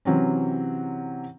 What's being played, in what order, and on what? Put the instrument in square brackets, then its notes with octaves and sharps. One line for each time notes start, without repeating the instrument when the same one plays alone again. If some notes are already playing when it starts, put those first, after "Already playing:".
[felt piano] C3 E3 F#3 C4 C#4